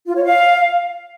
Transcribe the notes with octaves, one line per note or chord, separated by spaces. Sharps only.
F4
C#5
F5